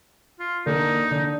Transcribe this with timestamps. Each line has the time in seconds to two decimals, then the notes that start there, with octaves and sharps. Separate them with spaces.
0.40 F4
0.66 D3 A#3 D#4
1.11 D3